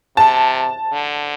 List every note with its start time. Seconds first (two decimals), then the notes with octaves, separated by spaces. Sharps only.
0.17 C3 A5
0.93 D3